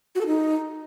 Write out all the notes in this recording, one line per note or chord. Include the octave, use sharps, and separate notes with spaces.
F#4
A4
D#4